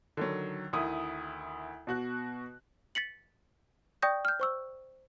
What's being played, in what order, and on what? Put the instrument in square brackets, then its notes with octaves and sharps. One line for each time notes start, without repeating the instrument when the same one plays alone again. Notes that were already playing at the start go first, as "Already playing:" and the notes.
[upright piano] D3 D#3 F#3
D2 D#3 E4 D#6
B2 F#4 F#6
[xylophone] A6 B6 C#7 F#7
D5 G5 C#6 D#6 G6 A#6
F6 G6
C5 C#6 E6